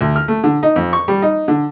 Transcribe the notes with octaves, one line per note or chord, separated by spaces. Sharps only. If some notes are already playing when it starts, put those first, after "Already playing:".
D2
F6
A3
D3
D#4
F2
C#6
G3
D#4
D3